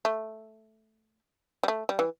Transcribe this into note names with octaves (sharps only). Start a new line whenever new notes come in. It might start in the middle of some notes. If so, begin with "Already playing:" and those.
A3
G3
A3
G3
E3